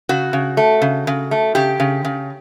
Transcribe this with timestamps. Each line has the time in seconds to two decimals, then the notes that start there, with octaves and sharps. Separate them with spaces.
0.09 C#3 F#4
0.33 C#3
0.57 A3
0.82 C#3
1.07 C#3
1.31 A3
1.55 C#3 G4
1.80 C#3
2.05 C#3